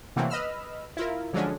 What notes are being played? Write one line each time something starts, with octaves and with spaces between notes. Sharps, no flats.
C3 E3 F#3 A3 A#3 C4
B4 D#5 B5 E6 F6
E4 F4 A#4
D3 F3 F#3 G#3 C#4 D4